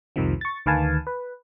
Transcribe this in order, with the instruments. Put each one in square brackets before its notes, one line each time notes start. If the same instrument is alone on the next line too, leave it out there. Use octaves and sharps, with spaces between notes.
[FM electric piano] C2 F2 C3 D#3 F3
C#6 A6
D2 D#3 B4 F5 G#5 A5
B4